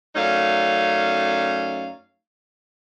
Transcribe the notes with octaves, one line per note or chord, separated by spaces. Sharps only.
F#2 A3 C#4 D#4 D5 F5